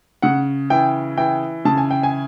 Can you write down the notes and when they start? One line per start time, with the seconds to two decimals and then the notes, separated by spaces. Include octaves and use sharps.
0.22 C#3 F#5
0.70 E3 G5
1.18 E3 G5
1.65 C#3 A5
1.77 G#5
1.91 G5
2.03 G#5